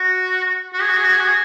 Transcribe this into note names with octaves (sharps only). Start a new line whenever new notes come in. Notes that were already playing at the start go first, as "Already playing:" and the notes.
Already playing: F#4
F#4
G#4
F#4
G#4
F#4
G#4
F#4
G#4